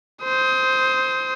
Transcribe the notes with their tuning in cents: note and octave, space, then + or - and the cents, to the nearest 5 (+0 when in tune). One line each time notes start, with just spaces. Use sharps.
C5 +0 D#6 +30